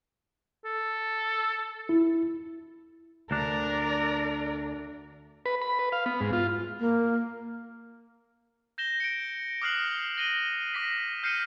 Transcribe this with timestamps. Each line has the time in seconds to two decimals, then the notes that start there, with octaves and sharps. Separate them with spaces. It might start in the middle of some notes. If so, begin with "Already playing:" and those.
0.65 A4
1.89 E4
3.31 D2 D4 A#4 D5
5.46 B4
5.61 B5
5.79 B4
5.92 F5
6.06 B3
6.21 G#2
6.33 F4
6.79 A#3
8.78 G6 A#6 E7 G7
9.00 C#7 D7
9.62 D6 D#6 F6 F#6 C7 F#7
10.18 A#6 D#7 G7
10.74 D6 A#6 B6
11.23 F6 G6 C7 C#7 D#7